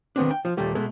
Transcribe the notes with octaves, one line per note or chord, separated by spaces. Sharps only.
D#3 B3 C4 D4
G5
F3
D#2 A#2 G3 A3
B2 G#3 A3